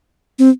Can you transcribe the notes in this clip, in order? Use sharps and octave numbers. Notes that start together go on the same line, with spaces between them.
C4